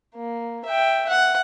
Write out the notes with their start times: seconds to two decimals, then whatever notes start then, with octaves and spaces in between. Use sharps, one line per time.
0.16 A#3
0.66 E5 G5
1.09 F#5